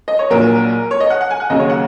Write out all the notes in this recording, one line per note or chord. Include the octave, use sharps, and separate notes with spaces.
D#5
C#5
A#1 A#2 F#3 A#4
C#5
D#5
F#5
F#5
G#5
F#5
D#2 C#3 F#3 D#5
C#5
F#5